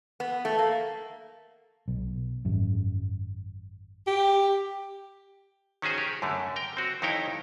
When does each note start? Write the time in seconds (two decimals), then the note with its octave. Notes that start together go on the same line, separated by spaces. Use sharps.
0.20 B3
0.45 A3
0.59 A#3
1.88 B1
2.45 G#1 F#2
4.07 G4
5.82 D#3 C#4 F#4 G#4 C5
5.98 G4 A#4
6.22 F#2 D3 A3
6.56 A#4 G5
6.77 C4 F#4
7.02 F2 D#3 D#4 E4 C#5 G5